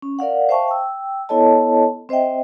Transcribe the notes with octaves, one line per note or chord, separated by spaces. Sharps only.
C#4
A#4 D5 F5 F#5
C5 E5 F5 G5 A5 C#6
G5 E6
B3 E4 A4 C#5 D#5 A5
C4 C5 D#5 E5 G5